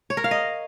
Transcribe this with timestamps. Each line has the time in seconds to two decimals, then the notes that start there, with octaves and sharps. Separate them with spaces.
0.10 C#5
0.17 A#4
0.24 F5
0.31 D#5